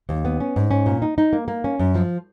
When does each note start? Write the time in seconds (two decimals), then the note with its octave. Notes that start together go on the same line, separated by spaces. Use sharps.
0.09 D#2
0.25 B3
0.40 C#4
0.56 G#2
0.71 C#4
0.86 A#2
1.02 D#4
1.18 D#4
1.33 A#3
1.48 A#3
1.64 C#4
1.79 F#2
1.95 F3